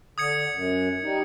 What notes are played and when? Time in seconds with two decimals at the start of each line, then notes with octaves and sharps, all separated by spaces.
0.18 D3 D#6 G#6 C#7
0.54 F#2
1.03 G3 D#4